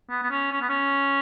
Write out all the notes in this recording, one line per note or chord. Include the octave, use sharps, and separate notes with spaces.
B3
B3
C#4
C#4
B3
C#4